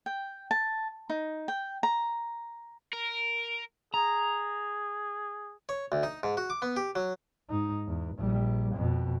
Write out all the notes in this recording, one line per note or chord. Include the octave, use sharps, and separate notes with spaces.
G5
A5
D#4
G5
A#5
A#4
G#4 A#5
C#5
D2
D#4
G#2
F#4
D6
B3
G4
F#3
G#2 D#4
E2
A#1 G3
F2 B2